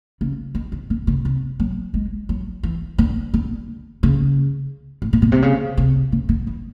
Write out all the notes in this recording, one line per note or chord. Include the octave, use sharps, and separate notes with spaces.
C#3
D#3
D3
D3
C#3
C3
F#3
G#3
F#3
E3
D3
D3
C#3
A2
A#2
B2
C3
C#3
C3
C#3
D3
E3